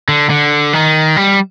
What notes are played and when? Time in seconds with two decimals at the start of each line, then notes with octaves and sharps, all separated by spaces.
0.08 D3
0.30 D3
0.73 D#3
1.17 G3